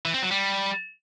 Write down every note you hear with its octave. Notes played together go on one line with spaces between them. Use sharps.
E3
C4
F#3
G3